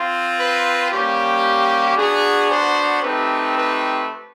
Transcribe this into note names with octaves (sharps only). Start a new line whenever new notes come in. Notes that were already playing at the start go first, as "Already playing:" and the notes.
Already playing: C4 F4
B4
G3 A#3 C#4 G4
B3 D4 F#4 G#4
C5
A3 C4 D#4 G4 B4
B4